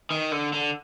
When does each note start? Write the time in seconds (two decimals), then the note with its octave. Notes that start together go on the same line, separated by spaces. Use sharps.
0.11 D#3
0.32 D3
0.53 D3